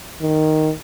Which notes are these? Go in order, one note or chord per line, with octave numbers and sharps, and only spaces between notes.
D#3